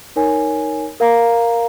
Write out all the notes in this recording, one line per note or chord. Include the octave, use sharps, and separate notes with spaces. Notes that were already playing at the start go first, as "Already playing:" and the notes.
D#4 A#4 C#5 G#5
A#4 F5 A#5